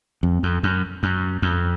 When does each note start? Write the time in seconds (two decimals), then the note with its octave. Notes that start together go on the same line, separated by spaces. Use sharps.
0.23 F2
0.43 F2
0.63 F#2
1.03 F#2
1.42 F2